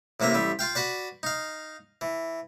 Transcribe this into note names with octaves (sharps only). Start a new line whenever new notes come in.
A1 C3 A#3 E5 A#5
A1 G3 E5
F4 F5 G5
F#4 B4 D5
D#4 F5
E3